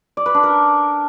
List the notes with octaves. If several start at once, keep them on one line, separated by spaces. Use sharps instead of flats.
D5
B4
D4
A#4